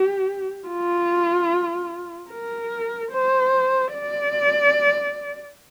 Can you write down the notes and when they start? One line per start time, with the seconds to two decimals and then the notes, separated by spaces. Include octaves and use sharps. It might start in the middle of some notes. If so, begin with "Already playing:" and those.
Already playing: G4
0.68 F4
2.30 A#4
3.12 C5
3.93 D5